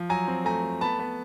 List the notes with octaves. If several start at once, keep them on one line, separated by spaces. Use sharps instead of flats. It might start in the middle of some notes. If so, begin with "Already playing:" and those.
Already playing: F3
F#3 G#5 A#5
C4
A3 G#5 A#5
A3
B3 A5 B5
B3